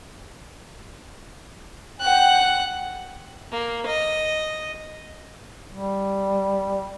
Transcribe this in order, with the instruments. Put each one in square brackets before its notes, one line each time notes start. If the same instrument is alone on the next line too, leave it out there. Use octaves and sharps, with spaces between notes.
[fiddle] F#5 F#6 [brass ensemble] G5
[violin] A#3
D#5
[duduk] G3